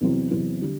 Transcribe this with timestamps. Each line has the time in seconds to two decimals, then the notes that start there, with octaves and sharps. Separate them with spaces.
0.01 E2 C3 F#3 C4
0.31 E2 C3 F#3 C4
0.62 D3 G3